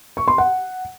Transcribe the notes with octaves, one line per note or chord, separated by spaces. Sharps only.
C#6
C6
F#5